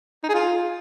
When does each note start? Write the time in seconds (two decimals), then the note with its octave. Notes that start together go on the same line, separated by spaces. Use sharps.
0.24 D#4
0.29 G#4
0.35 F4